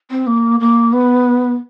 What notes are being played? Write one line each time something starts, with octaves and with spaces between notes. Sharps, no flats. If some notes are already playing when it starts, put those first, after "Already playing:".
C4
A#3
A#3
B3